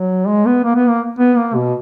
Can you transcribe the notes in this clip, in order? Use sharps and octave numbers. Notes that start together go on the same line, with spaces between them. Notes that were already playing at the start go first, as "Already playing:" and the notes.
Already playing: F#3
G#3
B3
A#3
B3
A#3
B3
A#3
B2